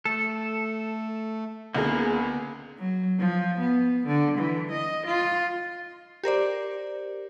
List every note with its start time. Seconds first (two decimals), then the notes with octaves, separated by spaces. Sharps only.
0.05 A3 A4
1.75 C#2 D3 A#3 B3 D#4 G#4
2.79 F#3
3.19 F3
3.60 B3
4.07 D3
4.38 E3
4.71 D#5
5.07 F4
6.23 G4 A#4 C5 D5